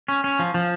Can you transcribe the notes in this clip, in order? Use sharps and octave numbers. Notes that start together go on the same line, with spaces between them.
C#4
C#4
F3
F3